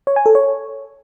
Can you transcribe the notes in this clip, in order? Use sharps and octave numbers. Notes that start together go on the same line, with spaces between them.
C#5
G#5
A4
C#5